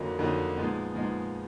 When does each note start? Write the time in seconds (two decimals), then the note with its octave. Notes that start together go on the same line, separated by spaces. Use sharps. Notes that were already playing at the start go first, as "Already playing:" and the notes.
Already playing: F2 D3 F#3 A#3 D#4
0.19 F2 D3 F#3 A#3 D#4
0.57 A#2 F3 G#3 B3 D#4
0.95 A#2 F3 G#3 B3 D#4